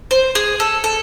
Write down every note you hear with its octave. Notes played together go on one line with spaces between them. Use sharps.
C5
G#4
A4
A4